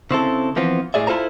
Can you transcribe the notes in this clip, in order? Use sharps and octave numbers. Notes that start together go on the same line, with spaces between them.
C#3 C4 E4 A4
E3 F3 B3 C4
A2 G#4 D5 E5
E4 F4 A4 C5 A#5